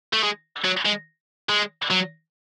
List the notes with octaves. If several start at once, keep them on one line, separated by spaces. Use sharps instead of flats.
A3
G#3
F#3
G#3
G#3
F#3